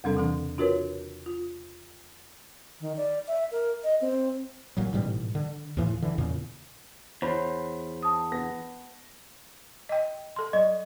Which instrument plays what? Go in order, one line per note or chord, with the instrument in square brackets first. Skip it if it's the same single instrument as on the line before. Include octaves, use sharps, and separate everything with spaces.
[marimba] E2 C3 G3 C4 D4 A4
C#3 E3 D4
D4 F4 F#4 A#4 B4 C#5
F4
[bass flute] D#3
D5
E5
A#4
D#5
C4
[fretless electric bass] G1 A#2 F#3
A1 G#2 B2 G3
D3
D#2 A2 E3 F3
D3 E3
E2 A#2 C#3
[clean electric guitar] E2 [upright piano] C5 C#5 B5
[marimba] A5 D#6
[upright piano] B3 A#6
[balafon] D#5 G5
A4 C6
[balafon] F#3 [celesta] D#5